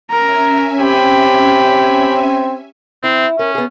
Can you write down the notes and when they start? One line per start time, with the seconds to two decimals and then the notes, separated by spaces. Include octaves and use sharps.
0.10 C#4 A#4 E5 G#5 A#5
0.81 C4 G4 B5
3.04 C4 E4
3.39 C#4 A#4
3.55 B3 G#4